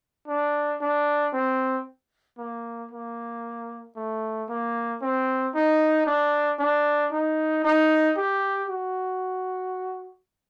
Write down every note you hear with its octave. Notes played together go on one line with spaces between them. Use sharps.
D4
D4
C4
A#3
A#3
A3
A#3
C4
D#4
D4
D4
D#4
D#4
G4
F#4